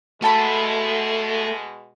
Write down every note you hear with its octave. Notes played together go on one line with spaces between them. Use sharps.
B2 G#3 A3 F#4 A5 B5